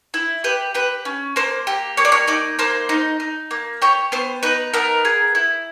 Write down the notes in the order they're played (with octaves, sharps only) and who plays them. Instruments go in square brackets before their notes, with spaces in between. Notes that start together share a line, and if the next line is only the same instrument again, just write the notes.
[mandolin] E4
G4 B4
G4 B4
C#4
A#3 C5
G4
A#3 C#5
D5
C#5
D#4 D5
A#3 C5
D#4
D#4
A#3
G4 C#5
B3 C5
D#4 B4
B3 A#4
G#4
E4